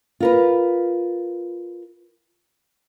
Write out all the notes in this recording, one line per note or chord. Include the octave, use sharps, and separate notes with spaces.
F4 A#4 B4